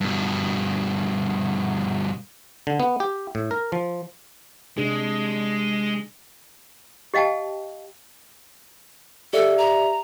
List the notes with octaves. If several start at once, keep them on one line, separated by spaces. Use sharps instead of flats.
G2 B2
D3
B3
G4
A2
A#4
F3
C3 G#3 D4 G#4
G4 D#5 F5 G5 A5
G4 A4 D5 E5
A#5